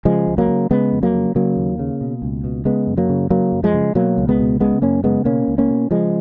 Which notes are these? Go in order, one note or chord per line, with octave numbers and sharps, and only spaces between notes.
C#3 F3 G#3
C#2
F#3 A#3
C#3
C#3 G#3 B3
F2
F#3 A#3
C#3
C#3 F#3 A#3
D#2
C#3
B2
C#2
B2
C#3 G#3 B3
F#2
F#3 A#3
C#3
C#3 F#3 A#3
F#2
F3 G#3
C#3
B2 F#3 A#3
C#2
G#3 B3
B2
C#3 G#3 B3
F#2 A#3 C#4
C#3 G#3 B3
B2 A#3 C#4
C#2
A#3 C#4
B2
C#3 F3 G#3